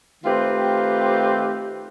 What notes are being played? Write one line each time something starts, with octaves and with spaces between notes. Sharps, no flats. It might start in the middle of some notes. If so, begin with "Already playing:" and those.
D#3 A3 C4 F4 G4 B4